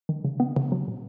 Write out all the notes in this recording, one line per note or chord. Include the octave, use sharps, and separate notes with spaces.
D#3
C#3
B3
C#3
F#3
A#2